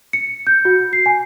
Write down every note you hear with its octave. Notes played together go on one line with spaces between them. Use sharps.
C#7
G6
F#4
C7
G#5